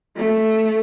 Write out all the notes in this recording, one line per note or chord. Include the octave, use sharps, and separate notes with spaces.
A3